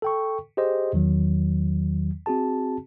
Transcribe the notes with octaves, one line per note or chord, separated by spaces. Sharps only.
A4 G5 C#6
G4 G#4 C5 D#5
E2 D#3 F#3
C4 F#4 G#4 A5